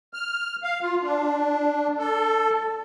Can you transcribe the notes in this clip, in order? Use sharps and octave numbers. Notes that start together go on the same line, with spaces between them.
F6
F5
F4
D4
A4